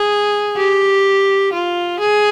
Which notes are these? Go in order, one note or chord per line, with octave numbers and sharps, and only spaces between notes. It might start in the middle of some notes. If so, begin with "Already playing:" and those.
Already playing: G#4
G4
F4
G#4